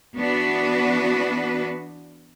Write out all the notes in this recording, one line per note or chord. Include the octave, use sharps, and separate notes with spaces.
E3 B3 D4 F#4 B4